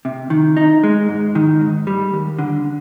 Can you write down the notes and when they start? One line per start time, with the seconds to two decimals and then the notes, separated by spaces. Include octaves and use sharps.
0.05 C3
0.30 D#3
0.57 D#4
0.83 G#3
1.09 G#2
1.35 D#3
1.61 G#2
1.87 G3
2.14 D#2
2.39 D3